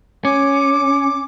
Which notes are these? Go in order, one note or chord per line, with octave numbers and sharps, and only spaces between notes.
C#4 D6